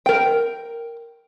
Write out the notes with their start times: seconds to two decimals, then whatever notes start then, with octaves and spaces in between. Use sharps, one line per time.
0.06 A#4 G5